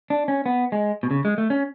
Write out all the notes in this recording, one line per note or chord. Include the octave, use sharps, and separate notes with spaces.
D4
C#4
B3
G#3
B2
C#3
G#3
A3
C#4